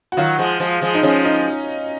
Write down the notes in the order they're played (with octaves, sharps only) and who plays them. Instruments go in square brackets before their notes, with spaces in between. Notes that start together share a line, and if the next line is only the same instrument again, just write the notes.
[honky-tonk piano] F#4
[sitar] D#3 F#3 [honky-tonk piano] F4
[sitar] F3 G#3
F3 G#3
F3 G#3
[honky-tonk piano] D#4
[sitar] F3 G#3 [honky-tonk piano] C#4
[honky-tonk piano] D#4